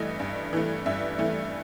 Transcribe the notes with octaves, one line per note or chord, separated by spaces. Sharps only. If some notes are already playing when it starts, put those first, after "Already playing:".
Already playing: G2 E3 A3 D#5
G2
E3 A3
G2 E5
E3 A3